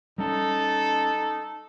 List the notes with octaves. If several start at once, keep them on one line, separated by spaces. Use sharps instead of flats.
G3 C#4 D#4 A4